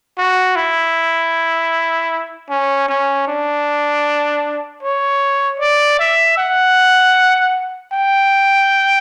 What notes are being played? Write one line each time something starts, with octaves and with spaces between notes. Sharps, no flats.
F#4
E4
C#4
C#4
D4
C#5
D5
E5
F#5
G5